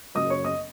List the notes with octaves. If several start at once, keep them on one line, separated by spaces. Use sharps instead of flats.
F#1 F#2 C#3 F#3 D#5 D#6
C#5 C#6
D#5 D#6